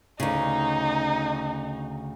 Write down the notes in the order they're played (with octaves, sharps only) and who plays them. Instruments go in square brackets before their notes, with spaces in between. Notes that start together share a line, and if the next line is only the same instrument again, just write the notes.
[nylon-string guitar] D2 C#3 [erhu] D#4